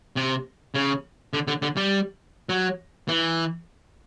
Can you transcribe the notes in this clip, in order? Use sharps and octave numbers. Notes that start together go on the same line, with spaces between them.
C3
C#3
D3
D3
D3
G3
F#3
E3